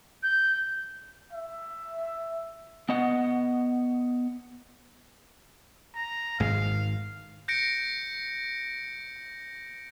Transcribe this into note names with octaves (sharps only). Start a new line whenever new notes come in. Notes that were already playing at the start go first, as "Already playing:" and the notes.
G6
E5
B3 D#5 F#5
A#5
G#1 G#2 G#3 F5
G6 A#6 C#7 D7